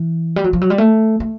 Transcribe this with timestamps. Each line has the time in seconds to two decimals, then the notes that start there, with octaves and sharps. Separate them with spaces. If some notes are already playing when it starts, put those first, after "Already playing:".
Already playing: E3
0.36 G3
0.44 F#3
0.53 F3
0.61 F#3
0.70 G3
0.78 A3
1.20 A3